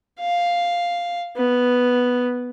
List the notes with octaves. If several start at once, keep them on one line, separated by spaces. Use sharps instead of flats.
F5
B3